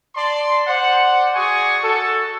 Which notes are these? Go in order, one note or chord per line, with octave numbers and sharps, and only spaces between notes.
D5 A5 C6
C5 D5 F#5
F#4 G#4 D5 G#5 C#6
F#4 A4